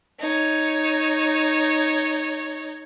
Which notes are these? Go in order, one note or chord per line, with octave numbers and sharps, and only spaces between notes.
D#4 C#5